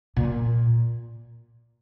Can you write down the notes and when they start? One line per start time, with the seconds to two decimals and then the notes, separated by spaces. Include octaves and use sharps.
0.16 A#2